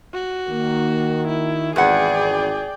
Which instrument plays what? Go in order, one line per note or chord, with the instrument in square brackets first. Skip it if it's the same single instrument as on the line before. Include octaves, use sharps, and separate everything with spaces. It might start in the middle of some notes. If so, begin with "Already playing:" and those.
[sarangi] F#4
[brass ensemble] D#3 [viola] A#3
[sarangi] E4
[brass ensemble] G#1 [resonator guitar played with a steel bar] E2 B4 F#5 [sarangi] G#4 [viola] D5 G5